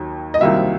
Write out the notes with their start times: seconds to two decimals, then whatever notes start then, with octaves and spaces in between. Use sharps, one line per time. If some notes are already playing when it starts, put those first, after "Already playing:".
Already playing: D#2 D#3 F#3
0.34 D#5
0.41 C2 C3 D#3 F#3 A#3 E5